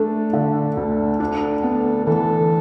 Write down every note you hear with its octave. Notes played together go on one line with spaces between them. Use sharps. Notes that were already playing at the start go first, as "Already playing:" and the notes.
Already playing: A3 D4 A4
D3
D2
D4
B3
E3 A4